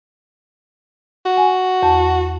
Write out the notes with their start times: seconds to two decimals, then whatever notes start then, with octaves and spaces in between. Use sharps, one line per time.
1.26 F#4
1.37 G#5
1.83 E2 A5